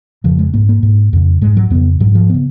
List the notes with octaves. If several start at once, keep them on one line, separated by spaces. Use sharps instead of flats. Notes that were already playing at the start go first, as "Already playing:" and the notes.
F2 C#3 F3
G#3
G#2 A#3
A#3
G#2
F2 C#3
G#2 G#3
F#3
F2 C#3 B3
G#2 F#3
F3
C#3 B3